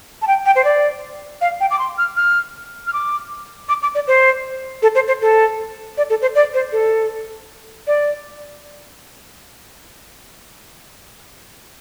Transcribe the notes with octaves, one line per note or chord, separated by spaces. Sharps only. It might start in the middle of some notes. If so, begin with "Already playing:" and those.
A5
G5
G5
C5
D5
F5
G5
D6
C6
F6
F6
F6
D6
D6
D6
D5
C5
A4
C5
C5
A4
D5
A4
C5
D5
C5
A4
D5